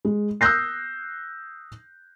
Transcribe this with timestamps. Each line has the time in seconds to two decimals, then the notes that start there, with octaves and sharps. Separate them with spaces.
0.05 G#3
0.41 D#6 E6 F#6 G6 A#6 C7